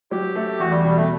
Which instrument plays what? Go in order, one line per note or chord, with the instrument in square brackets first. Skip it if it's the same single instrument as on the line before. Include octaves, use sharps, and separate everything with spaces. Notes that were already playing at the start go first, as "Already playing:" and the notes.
[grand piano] F#3 [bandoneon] G4
[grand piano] A3
[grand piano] E2 [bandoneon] F#4
[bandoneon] G3
[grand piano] B2 [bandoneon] G3
[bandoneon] A3